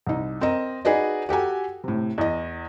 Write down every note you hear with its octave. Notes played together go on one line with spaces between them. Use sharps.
C2 D#4
C4 A#4 D#5
D#4 F#4 G#4 B4 D5 D#5
F#4 G4 A4 G#5
A2 C3
E2 D#5